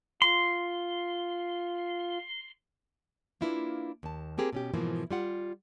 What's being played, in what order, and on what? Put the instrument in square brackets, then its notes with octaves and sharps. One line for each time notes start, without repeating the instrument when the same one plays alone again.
[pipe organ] F4 [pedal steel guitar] C6
[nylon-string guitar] A#3 D4 E4 F4 A#4 B4
D#2 A5
A#3 C4 G4 G#4 A#4
B2 C#4 G4
G#2 B2 E3 F3 A#3 E4
G3 F4 F#5